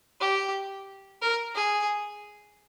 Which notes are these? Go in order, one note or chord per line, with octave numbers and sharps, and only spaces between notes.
G4
A#4
G#4